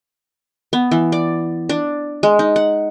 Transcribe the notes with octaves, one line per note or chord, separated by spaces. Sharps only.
B3
E3
D5
D4
G#3
D#4
F#5